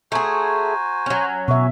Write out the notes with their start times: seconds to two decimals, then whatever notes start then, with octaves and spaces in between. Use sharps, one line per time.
0.12 A3 F#4 G#4 C5 G#5 A#5
1.06 F#3 C#4
1.48 B2 E5 C#6